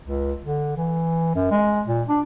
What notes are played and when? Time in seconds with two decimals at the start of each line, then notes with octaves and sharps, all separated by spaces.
0.02 C#2
0.43 D3
0.76 E3
1.35 F#2
1.51 G#3
1.86 A#2
2.08 D4